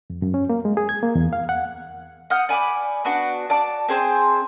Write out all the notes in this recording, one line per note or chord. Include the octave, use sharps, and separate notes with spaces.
F2
F#2
C#4
A#3
G#3
G#4
G#6
A#3
E2
F5
F#5
F#5 D#6 F6 G6
D5 G#5 B5 D6
B3 D4 F#4
D5 A5 D6
C4 G#4 C5 A5